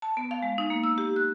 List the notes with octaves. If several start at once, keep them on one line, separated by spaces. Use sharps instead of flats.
A5
B3
F5
G#3
D#4
A#3
E6
G4
F#6